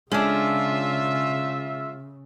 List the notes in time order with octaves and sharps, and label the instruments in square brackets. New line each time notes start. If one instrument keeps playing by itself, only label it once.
[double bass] C#3 [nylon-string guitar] G#3 [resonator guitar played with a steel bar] C#4 D4 [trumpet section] F4 E5